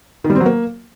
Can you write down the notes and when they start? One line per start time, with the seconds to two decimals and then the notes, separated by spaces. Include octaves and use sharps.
0.24 D#3
0.30 G3
0.35 C4
0.40 F#3
0.46 A#3